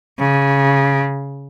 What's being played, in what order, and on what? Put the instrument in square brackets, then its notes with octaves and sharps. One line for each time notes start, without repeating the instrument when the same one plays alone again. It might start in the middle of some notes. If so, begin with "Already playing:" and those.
[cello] C#3